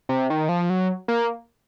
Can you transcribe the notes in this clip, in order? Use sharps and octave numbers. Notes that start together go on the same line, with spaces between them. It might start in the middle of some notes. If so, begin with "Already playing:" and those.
C3
D#3
F3
F#3
A#3